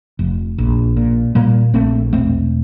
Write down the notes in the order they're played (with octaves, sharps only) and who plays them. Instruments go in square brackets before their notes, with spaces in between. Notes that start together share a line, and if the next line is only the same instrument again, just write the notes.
[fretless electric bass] F1
A#1
A#2
A#2 G3 A#3
A#1 A3 C4
E1 A3 C4